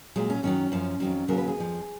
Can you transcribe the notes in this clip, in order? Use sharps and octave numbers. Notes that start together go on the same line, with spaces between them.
A#2 F#3 G#3
C#4
F#2 D#3 F#3 C#4
F#2 F3
F2 D#3 F#3
D#2 C#3 F#3 A#4
B4
G#4
F2 F3